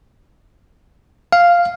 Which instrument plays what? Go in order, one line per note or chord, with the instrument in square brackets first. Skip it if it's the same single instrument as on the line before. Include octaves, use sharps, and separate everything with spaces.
[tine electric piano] F5